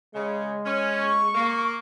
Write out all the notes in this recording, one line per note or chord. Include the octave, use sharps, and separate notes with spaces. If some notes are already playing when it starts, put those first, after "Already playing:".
C#3 G#3
C#4
C#6
A#3